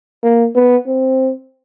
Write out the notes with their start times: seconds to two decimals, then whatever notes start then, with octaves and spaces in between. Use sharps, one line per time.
0.23 A#3
0.55 B3
0.87 C4